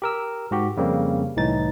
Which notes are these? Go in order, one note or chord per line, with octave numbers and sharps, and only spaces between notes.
G4 A#4 E6
G#2 F#4 G4
F2 C#3 G3 A#3 C4
C2 A2 E3 D#4 A6